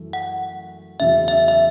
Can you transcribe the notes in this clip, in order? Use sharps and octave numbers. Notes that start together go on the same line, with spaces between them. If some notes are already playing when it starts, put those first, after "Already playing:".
Already playing: F#2 E3 A3
F#5
E2 C#3 F#3 E5
E5
E5